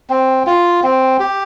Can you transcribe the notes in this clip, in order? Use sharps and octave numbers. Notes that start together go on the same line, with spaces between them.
C4
F4
C4
G4